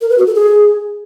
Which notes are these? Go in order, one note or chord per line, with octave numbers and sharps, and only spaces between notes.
A#4
B4
F#4
A4
G#4